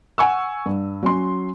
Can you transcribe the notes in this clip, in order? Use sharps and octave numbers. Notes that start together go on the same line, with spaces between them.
F#5 G#5 C#6 E6
G2
F#3 C#4 C6